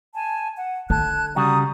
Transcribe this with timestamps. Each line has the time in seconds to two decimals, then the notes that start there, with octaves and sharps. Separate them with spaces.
0.15 G#5 A5
0.57 F#5
0.90 D3 A4 A5 F#6 G#6
1.36 C#3 G3 F#4 A#5 D#6